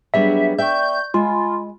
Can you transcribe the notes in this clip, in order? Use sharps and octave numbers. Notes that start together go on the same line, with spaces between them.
F#3 G3 B3 D4 G#4 E5
D5 E5 G5 C#6 G6
G#3 F4 G#5 B5